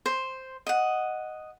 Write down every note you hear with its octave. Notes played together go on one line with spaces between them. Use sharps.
C5
D#5 F#5